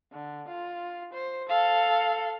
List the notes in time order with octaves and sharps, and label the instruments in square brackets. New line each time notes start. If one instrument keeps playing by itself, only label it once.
[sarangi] D3
F4
C5
[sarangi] A4 [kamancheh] F5